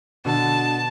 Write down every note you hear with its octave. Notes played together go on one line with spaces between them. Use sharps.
B2 D3 A5